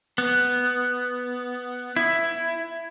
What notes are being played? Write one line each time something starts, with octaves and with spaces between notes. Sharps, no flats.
B3
E4